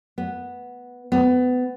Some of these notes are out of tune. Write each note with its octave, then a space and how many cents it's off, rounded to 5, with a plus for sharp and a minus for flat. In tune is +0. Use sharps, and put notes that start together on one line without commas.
B3 -5
B3 +25